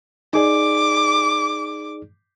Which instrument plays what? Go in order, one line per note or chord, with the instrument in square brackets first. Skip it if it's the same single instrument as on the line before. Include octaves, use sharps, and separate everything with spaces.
[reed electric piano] D#4 G#4 D5 [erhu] D6